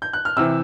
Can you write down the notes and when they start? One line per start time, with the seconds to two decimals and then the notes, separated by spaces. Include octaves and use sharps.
0.02 G6
0.13 F#6
0.25 F6
0.37 C3 E3 E6